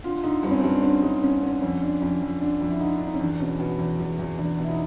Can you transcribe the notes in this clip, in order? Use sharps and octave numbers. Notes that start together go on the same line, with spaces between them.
D3 F4
D3 D#4
G2 C4
C#4
C4
G2
D4
D3 C#4
G2 D#4
D3 C#4
D3 C#4
F2 C#4
D3 D4
F2 C#4
F2
D3 D4
F2
E4
D3 D#4
D4
D3
D#4
C#4
E2 D4
B2 C#4
B2
E2
E2
E2
E2 D4
B2 E4
D#4